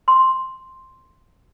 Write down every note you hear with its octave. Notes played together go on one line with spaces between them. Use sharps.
C6